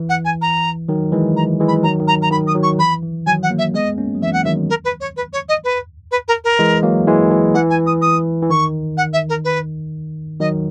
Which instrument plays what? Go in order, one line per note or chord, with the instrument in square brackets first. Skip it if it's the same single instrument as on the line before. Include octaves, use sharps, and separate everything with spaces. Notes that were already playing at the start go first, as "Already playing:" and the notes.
Already playing: [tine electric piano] E3
[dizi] F#5
G#5
A#5
[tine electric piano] D#3 F#3
E3 G#3
[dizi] A#5
[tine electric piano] E3 G#3
[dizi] B5
[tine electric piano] D#3 F#3 [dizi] A#5
[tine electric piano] D#3
[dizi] A#5
A#5
[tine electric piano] D#3 [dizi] B5
[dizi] D#6
[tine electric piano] D#3 F#3
[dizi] C#6
[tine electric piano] E3 [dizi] B5
[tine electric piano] E3
[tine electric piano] D#3 F#3 [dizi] G#5
[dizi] F#5
[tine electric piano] F#3 A#3
[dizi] E5
[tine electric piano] G#3 B3 [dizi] D#5
[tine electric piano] A#3 C#4
F#3
[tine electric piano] E3 [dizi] E5
[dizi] F#5
[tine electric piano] D#3 F#3 [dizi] E5
[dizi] A#4
B4
C#5
B4
C#5
D#5
B4
B4
A#4
A#4
[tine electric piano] E3 G#3
F#3 A#3
E3 G#3
E3
[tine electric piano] E3 [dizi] F#5
[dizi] G#5
D#6
D#6
[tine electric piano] E3
[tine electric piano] D#3 [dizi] C#6
[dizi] F#5
E5
A#4
B4
[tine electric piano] D#3 F#3 [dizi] D#5